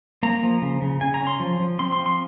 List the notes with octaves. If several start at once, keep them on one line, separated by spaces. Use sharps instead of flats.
A#3 A#5
F3
C#3
C#3
C#3 G#5
A#5
C#4
C6
F3
F3
C4 C6
C6
F3
C6